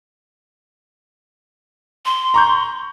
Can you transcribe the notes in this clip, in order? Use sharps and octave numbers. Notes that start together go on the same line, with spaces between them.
C6
A#5 C#6 G6